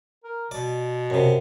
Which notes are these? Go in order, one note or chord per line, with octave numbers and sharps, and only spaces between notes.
A#4
B2 D5
F#2 C3